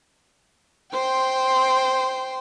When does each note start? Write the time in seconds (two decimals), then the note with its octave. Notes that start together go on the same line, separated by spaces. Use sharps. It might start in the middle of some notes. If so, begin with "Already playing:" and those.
0.92 C5 G5 C6